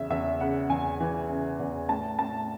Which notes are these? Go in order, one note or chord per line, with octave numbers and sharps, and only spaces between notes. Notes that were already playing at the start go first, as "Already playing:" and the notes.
Already playing: E2 C#3 E5
E2 E5
C#3 F#5
E2 G#5
E3
C#3
E2
A2 A5
A2 A5